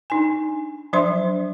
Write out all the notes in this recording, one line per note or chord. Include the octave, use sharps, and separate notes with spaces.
D4 D#4 G#5
F3 F#3 D4 C5 E5 C6